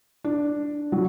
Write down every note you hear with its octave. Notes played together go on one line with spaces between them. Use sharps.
D4
F#3